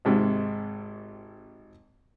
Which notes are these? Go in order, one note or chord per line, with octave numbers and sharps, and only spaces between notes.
G#1 G#2 C3